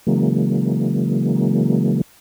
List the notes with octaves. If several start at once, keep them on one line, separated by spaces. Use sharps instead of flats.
C#3 E3 F#3 G#3 A#3